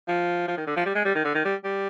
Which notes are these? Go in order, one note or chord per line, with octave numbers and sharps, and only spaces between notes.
F3
F3
D#3
D3
F3
G3
G#3
G3
D#3
D3
D#3
G3
G3